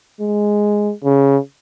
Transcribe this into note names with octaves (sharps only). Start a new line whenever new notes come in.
G#3
C#3